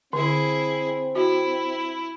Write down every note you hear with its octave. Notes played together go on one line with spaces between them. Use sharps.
D3 C4 E4 G#4
E4 F#4